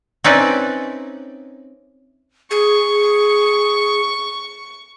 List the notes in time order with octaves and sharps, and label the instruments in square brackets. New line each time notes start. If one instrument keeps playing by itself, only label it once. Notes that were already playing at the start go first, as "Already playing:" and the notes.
[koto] C4 C#4 D#4 B4 D5 E5
[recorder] G#4 [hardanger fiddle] C#6